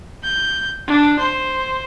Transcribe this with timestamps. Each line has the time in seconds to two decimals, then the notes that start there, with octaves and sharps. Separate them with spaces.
0.23 G6
0.87 D4
1.20 C5